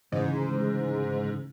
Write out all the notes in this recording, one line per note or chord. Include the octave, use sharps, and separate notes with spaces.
D2 G#2 C#3 E3